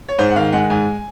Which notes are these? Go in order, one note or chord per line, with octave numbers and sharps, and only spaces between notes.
C#5
G#2 C5
F#5
D#3 F5
G#3 F#5
G#2 G#5